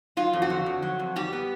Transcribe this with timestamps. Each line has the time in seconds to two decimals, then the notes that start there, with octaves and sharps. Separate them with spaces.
0.17 F#3 F4
0.33 F2
0.42 F#4
0.50 D3
0.66 F2
0.82 F#3
0.99 F2
1.16 G3 G4
1.32 B3